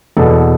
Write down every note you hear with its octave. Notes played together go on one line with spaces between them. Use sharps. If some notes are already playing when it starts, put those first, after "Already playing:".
E2 B2 A4